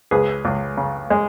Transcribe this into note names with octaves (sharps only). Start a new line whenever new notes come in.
C#2 G#4 B4
C#2
C#3
G#3